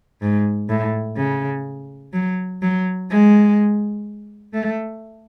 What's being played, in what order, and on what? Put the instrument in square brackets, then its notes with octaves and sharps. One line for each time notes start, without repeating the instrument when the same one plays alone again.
[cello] G#2
A2
C#3
F#3
F#3
G#3
A3